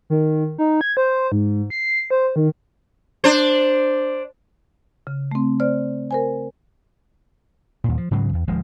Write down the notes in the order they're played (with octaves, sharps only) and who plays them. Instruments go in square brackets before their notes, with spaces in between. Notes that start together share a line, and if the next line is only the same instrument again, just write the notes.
[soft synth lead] D#3
D#4
G#6
C5
G#2
C7
C5
D#3
[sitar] D4 C5
[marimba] C#3
A3 C4
C5 D5 F6
A#4 C5 G#5
[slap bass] D#2 A#2
F3
G#2 C#3 F#3 G#3
E2
D1 F3 G#3